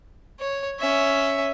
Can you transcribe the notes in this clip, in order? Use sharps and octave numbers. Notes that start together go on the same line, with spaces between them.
C#5
C#4 E5